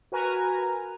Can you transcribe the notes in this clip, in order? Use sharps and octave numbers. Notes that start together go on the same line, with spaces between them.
F#4 A#4 B4 G#5 A#5